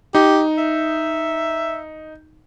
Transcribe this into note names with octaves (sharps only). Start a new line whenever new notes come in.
D#4 G4
E5